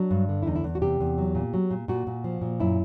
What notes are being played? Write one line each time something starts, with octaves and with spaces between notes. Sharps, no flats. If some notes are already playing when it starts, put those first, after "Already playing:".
Already playing: F#3 D4
G2
D3
E4
E2 D#4
E4
E2
F#4
C3 G4
E2
F#3
A#2
F#3
A#2
A#2 F#4
A#2
F3
A#2
F#2 E4